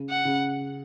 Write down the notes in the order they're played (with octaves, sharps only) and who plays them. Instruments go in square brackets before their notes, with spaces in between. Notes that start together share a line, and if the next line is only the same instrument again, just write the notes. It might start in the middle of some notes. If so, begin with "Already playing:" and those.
Already playing: [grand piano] C#3
[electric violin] F#5
[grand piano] C#3